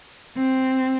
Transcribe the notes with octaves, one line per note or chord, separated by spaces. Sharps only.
C4